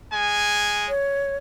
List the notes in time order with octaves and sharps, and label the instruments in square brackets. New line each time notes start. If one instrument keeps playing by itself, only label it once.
[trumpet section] G#3 G#5
[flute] C#5